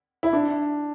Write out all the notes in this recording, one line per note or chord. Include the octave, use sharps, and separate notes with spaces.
E4
D4